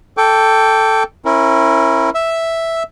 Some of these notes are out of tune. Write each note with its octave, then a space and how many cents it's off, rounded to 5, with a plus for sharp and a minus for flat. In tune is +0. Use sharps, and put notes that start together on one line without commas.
A4 +5 G5 +0 D6 -35
C#4 -35 E4 +0 A#4 +0
E5 +0 E6 +0